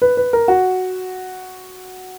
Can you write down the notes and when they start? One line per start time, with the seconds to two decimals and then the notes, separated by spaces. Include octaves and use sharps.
0.02 B4
0.17 B4
0.33 A#4
0.48 F#4